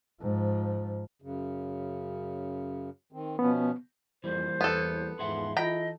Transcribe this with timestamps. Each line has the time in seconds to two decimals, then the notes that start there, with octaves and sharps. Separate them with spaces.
0.22 G#2 F3
1.22 F#2 C#3
3.12 D#3 C4
3.39 B2 F3 B3 C#4
4.24 F2 E3 G3 A#3 C5
4.61 E2 B3 A4
5.19 E2 G#2 F3 G#4 E5 F#5 C6
5.57 E3 F4 A4 D#5 G5 A#5 B5